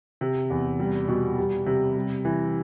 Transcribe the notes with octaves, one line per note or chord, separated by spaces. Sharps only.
C3
E2
G3
B2
G3
C3
G3
E3